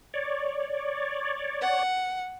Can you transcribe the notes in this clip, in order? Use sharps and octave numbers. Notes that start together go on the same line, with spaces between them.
C#5 D5
F#5